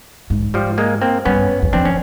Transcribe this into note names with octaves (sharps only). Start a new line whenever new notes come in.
G#2
F3 G3
G#3 A#3
A#3 C4
G2 B3 C#4
E2
F2 C4 D4
C#4